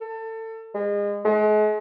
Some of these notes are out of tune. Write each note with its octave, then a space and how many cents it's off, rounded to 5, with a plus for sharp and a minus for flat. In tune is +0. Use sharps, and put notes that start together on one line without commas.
A4 +25
G#3 -30
G#3 +40